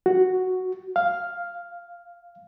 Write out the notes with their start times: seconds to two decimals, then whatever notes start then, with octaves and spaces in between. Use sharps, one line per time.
0.06 F#4
0.96 F5